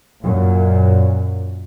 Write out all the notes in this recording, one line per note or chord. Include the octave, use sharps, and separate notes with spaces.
F#2 A#2